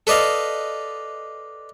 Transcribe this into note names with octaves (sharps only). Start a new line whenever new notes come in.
A4 B4 D5 D#5 F5